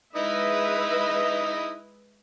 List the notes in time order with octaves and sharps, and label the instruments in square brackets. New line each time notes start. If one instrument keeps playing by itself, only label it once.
[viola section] G#3 B4 E5 [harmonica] D#4 E4 D#6